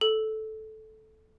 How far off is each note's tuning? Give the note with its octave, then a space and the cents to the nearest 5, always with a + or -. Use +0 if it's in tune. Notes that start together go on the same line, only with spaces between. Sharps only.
A4 -10